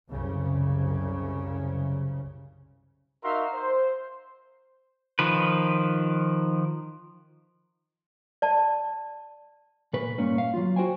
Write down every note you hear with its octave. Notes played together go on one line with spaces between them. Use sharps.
C2 F#2 C#3
D#4 F#4 A#4 E5 F5 C6
C5
D#3 F3 B4
D5 A5
A#2 B4
G2 A#2 C#4
F5
F#3 F4
F#4 C5 G5 G#5